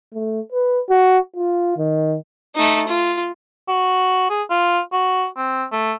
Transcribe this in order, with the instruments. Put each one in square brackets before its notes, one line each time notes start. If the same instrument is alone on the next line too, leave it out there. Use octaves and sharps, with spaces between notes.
[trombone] A3
B4
F#4
F4
D#3
[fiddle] A3 D#4
F4
[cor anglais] F#4
G#4
F4
F#4
C4
A3